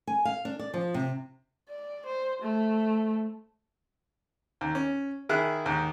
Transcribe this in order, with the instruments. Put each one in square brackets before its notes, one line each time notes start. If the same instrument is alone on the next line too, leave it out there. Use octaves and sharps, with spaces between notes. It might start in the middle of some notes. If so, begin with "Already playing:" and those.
[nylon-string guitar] G#5
F5
D4
D5
F3
C3
[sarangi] D5
C5
A3
[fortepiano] D#2
C#4
D#3 E4 G#4 F6 F#6
D#2 G#2